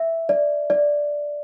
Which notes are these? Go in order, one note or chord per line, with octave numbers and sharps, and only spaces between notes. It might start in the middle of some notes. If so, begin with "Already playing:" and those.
Already playing: E5
D5
D5